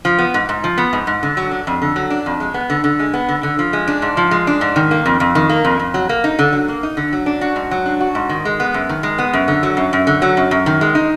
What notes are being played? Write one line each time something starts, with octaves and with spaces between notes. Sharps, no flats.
F3
B3
G#2
G#2
F3
B3
G#2
G#2
D3
F#3
D4
F2
D3
F#3
D4
F2
G#3
B3
D3
D3
G#3
B3
D3
D3
F3
G#3
D4
G#2
F3
G#3
D4
G#2
D#3
A#3
F2
F2
D#3
A#3
F2
F2
F#3
A#3
D#4
D3
F#3
A#3
D#4
D3
F#3
D4
F#4
G#2
F#3
D4
F#4
G#2
D#3
G#3
B3
F#2
D#3
G#3
B3
F#2
D3
F#3
F#2
F#2
D3
F#3
F#2
F#2
D#3
G#3
D#4